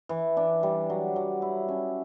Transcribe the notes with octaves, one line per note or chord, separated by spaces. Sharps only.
E3
D4
G3
F#3
F#3
E4
C#4